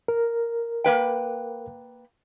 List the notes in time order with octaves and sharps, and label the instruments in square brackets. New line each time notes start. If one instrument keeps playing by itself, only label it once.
[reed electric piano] A#4
[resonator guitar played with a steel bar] A#3 B4 G5